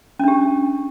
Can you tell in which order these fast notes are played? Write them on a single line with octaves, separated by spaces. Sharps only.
C#4 D4 G4